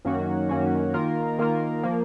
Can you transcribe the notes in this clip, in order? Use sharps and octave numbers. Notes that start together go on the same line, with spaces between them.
F#2 D#3 A#3 C#4 F#4
F#2 D#3 A#3 C#4 F#4
D#3 A#3 F4 A#4
D#3 A#3 F4 A#4
F3 A#3